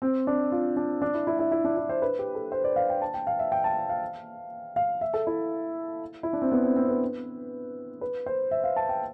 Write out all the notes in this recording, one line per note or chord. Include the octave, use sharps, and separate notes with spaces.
C4
D4
F4
D4
D4
E4
E4
E4
E4
D4
E4
C5
B4
G4
A4
C5
D5
F5
G5
A5
G5
F5
E5
G5
A5
G5
F5
F5
E5
A4
E4
E4
D4
C4
B3
C4
C4
B4
B4
C5
E5
F5
A5
G5